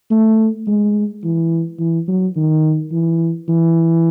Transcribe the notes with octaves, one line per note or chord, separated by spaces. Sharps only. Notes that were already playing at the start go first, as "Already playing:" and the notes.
A3
G#3
E3
E3
F#3
D#3
E3
E3